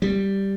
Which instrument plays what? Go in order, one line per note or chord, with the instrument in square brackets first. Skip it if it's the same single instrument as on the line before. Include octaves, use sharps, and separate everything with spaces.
[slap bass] G3